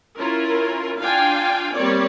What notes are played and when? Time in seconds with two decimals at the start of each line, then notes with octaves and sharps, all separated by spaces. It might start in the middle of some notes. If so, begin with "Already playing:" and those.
0.17 C#4 E4 F4 A#4
0.99 D4 F4 F5 G5 G#5
1.74 G3 A#3 C4 C#5 D5